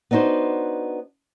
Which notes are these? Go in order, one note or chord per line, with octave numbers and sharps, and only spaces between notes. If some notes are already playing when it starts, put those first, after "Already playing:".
B3 D4 D#4 F#4 C5